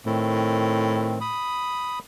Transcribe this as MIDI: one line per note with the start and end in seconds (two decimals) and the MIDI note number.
0.06 1.34 45
0.06 1.19 51
0.06 1.19 60
1.21 1.99 83
1.21 1.99 87